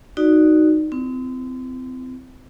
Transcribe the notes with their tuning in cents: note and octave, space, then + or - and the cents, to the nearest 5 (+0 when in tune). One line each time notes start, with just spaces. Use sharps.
D#4 +0 F#4 +0 D5 +10
C4 -30 E4 +30